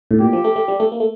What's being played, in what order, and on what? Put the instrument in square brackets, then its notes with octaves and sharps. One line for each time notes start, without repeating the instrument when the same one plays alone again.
[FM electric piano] A2
[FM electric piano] A#2 [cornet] G4
[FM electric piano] F3
A3
A3
G3
A3
A#3
A3